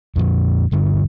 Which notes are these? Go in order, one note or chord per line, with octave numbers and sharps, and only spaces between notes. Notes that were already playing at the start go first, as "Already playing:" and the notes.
F2 A#2 F3
D#1 G2 D3